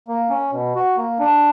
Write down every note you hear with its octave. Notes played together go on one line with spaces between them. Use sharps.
A#3
C#4
B2
F#4
A#3
D4